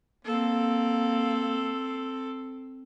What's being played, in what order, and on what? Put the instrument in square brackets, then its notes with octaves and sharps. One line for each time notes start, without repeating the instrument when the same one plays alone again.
[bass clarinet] A#3 [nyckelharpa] C4 A4